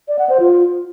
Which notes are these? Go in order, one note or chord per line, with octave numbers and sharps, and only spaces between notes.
D5
F#5
C5
F4